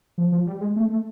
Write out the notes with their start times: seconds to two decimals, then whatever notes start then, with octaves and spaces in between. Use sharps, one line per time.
0.18 F3
0.32 F3
0.47 G3
0.61 G#3
0.76 A3
0.90 A3